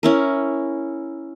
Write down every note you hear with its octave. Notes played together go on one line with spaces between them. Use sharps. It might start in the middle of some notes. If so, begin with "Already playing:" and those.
C#4 E4 A#4